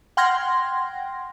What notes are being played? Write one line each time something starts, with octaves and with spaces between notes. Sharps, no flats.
F#5 G5 C6 F6 G#6 A#6